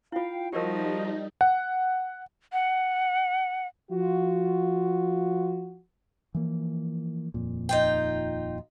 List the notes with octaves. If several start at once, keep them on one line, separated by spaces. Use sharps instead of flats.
E4 F4 F5 G5
F3 G3 D#4 F#4 G4 A#4 D#5
F#5
F#5
F3 F4 F#4
E3 F3 A#3
D#1 F2 A#2
D#4 F4 G5